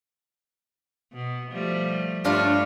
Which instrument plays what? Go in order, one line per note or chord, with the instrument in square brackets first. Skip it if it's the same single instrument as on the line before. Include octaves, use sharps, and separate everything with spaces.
[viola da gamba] B2
F3 G3 A3
[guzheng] G2 D4 F4 [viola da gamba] G3 A3 C#5